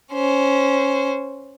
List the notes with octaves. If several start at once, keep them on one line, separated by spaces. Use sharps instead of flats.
C#4 C5